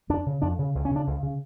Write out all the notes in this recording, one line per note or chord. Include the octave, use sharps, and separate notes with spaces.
F2 D4
C#3
F2 D4
C#3
C#2
C#4
C#3 D4
C#2
C#3